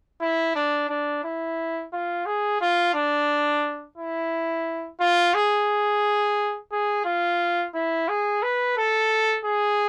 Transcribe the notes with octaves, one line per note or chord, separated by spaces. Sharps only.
E4
D4
D4
E4
F4
G#4
F4
D4
E4
F4
G#4
G#4
F4
E4
G#4
B4
A4
G#4